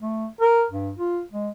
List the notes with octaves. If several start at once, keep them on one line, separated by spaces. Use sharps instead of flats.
A3
A#4
G2
F4
G#3